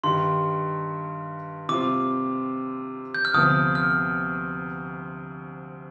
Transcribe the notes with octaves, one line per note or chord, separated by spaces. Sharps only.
G2 D#3 G3 C6
C3 G3 C4 F4 D6
G6
F6
D2 C3 F3 B3 D#6
F6